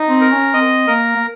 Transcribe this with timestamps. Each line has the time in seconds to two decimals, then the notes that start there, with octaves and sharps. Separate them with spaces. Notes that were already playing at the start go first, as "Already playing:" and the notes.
Already playing: D#4
0.09 C4
0.21 A#4
0.32 C#4
0.54 C4 D#5
0.87 A#3 A#4
1.16 A#3